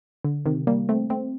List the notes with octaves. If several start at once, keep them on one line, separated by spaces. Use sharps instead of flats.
D3
C3 D#3
G3 A#3
A3 C4
A3 C4